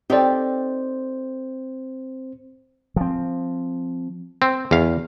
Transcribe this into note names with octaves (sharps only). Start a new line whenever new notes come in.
C4 D#4 G4 A4 C5 D5
F3 C4
C4
E2 F5